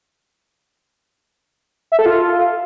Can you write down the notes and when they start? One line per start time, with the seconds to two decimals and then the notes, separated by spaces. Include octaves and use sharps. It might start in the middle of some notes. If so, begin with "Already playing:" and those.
1.92 E5
1.99 A4
2.06 F4